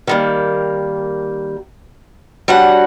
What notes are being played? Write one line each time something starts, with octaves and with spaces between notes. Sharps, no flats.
D#3 G3 A#3
G3 D4 F#4 C#5 F#5